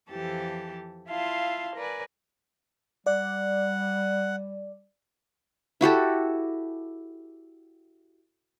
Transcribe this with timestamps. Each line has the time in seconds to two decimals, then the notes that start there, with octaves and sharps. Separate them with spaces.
0.10 F2 E3 F3 G4 A4 A5
1.08 E4 F4 E5 F5 A5 C6
1.75 A#4 B4 D5 G#5
3.06 G3 D5 F#5
5.81 E4 F#4 G4 A4